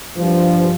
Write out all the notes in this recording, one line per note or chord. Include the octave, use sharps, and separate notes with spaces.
G2 F3